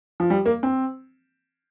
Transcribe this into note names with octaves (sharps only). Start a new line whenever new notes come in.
F3
G3
A#3
C4